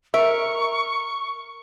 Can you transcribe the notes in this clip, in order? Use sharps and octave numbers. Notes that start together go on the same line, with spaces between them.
A#4 E5 C#6